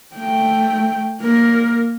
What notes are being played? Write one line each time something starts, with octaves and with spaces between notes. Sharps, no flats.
A3 G5
A#3 A#4